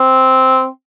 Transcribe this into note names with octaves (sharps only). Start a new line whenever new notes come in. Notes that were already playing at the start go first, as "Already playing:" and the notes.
Already playing: C4